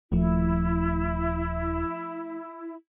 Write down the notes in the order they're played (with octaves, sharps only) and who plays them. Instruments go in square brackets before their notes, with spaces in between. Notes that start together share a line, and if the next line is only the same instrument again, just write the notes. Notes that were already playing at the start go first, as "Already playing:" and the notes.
[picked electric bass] D#1 [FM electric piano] F3 A3 [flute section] E4